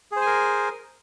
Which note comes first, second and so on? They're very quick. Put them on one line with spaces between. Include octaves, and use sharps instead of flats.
G#4 C5 G#5 A#4